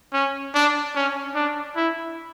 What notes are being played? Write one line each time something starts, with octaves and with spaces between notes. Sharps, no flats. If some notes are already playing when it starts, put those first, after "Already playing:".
C#4
D4
C#4
D4
E4